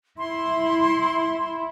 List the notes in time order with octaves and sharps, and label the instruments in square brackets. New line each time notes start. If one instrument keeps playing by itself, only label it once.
[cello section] E4 [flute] C6